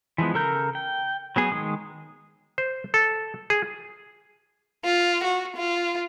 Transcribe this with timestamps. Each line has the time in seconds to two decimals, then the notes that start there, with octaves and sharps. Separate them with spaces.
0.18 E3 F3 G#3 B3
0.34 C#3 A4 A#4 A#5 G6
0.75 G5
1.36 F#3 B3 G#4
1.52 D#3 G#3 D#6
2.58 C5
2.94 A4
3.50 G#4
4.85 F4
5.24 F#4
5.56 F4